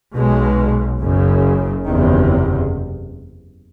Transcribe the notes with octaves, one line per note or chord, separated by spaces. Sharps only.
B1 B2 G#3
F#1 F#2 C#3
F#1 E2 C3 D#3